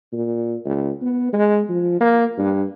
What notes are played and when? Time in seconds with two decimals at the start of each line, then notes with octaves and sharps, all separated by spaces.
0.12 A#2
0.65 C#2
1.02 B3
1.33 G#3
1.69 F3
2.00 A#3
2.38 G2